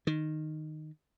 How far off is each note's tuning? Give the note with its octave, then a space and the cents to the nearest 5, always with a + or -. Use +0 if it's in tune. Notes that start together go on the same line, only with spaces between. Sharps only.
D#3 -10